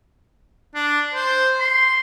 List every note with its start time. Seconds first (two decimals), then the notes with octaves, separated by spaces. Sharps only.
0.75 D4
1.14 C5
1.60 C6